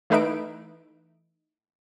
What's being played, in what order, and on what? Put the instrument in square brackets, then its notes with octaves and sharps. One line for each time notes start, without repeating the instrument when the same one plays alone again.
[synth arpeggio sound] E3 A3 D#4 B4 E5 D7